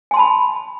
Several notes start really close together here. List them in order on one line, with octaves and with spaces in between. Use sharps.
G#5 C6 A5 B5